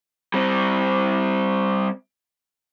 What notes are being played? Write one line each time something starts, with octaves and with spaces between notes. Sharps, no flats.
G3 C4